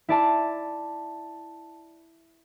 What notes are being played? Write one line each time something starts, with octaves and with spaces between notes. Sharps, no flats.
E4 D5 A5